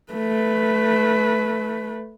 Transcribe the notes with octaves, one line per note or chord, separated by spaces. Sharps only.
A3 B4